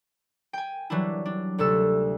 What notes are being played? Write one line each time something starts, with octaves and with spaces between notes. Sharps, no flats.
G5 G#5
E3 F#3 G3 D4 E4
D4
D2 C3 A4 E6